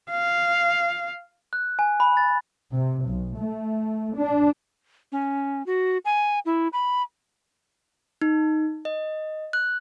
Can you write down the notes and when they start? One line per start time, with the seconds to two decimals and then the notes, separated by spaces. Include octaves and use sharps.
0.10 F5
1.53 F#6
1.79 G#5
2.00 B5
2.17 A6
2.72 C3
3.05 B1
3.37 A3
4.16 D4
5.12 C#4
5.66 F#4
6.05 G#5
6.45 E4
6.73 B5
8.22 D#4
8.85 D#5
9.53 F#6